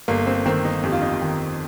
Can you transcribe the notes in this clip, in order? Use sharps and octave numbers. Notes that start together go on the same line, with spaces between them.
G1 A#3
C4
D#3 C4
D#4
F2 G4
F4
D#4
F4
D#3